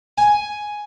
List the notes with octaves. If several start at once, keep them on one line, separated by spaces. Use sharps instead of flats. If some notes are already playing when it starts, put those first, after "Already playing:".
G#5